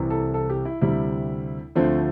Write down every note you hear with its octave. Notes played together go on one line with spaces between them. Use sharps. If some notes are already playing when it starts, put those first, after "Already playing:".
Already playing: C2 C3 E3
A4
A4
G4
E4
D2 C3 G3 E4
D2 D3 F3 A3 C4